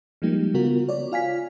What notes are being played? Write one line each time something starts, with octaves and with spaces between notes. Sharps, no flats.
F3 G3 G#3 A#3 D#4 G4
C#3 B3 F4 F#4 A#4
C#5 D5
F4 F5 G#5 B6